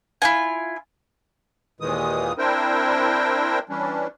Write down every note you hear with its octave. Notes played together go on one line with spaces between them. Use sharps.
E4 F4 G#5
D#2 A#2 D#3 E3 G#3 D#6
C4 D4 E4 A#4 C5 G5
E3 G3 C#4 D4